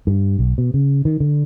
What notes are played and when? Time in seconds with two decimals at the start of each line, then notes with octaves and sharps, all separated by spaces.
0.07 G2
0.39 B1
0.58 B2
0.74 C#3
1.05 D#3
1.20 D3